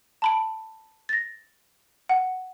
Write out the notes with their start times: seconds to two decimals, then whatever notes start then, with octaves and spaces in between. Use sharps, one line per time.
0.22 A5 B5 D7
1.09 A6 A#6
2.09 F#5